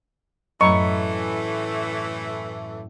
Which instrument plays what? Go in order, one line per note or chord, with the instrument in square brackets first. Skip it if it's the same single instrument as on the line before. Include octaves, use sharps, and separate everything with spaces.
[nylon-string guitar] F#2 A2 [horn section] E3 A3 [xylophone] D#5 A#5 B5 [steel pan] C#6